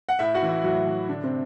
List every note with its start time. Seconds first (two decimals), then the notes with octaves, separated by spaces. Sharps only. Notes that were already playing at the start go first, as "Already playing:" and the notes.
0.09 F#5
0.19 A2 E4 E5
0.34 F#4 F#5
0.42 E3
0.49 E4 E5
0.64 A2 F#3 F#4
0.87 E3
1.09 A2 D3 D4
1.24 C3 C4